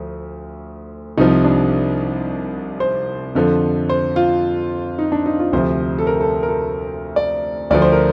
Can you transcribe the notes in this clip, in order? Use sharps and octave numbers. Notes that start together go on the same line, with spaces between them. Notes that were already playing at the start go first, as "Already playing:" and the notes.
Already playing: D2 F3
C2 C3 F3 D#4
D4
C5
F2 D3 F3
C5
F4
D#4
D4
D#4
F4
D2 C3 F3 C5
A4
A#4
A4
A#4
A4
D5
D2 D3 F3 D5
C5
A#4